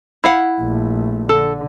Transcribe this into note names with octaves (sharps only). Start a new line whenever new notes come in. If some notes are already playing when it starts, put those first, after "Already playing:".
E4 F5 F#5
A#1 A3
D3 A4